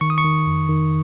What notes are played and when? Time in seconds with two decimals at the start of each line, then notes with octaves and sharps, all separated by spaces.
0.01 D#3 C#6
0.10 D#6
0.18 C#6
0.24 D#3
0.46 F2
0.69 D#3